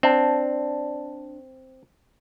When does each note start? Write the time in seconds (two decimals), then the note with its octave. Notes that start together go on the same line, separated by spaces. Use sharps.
0.03 C4 D4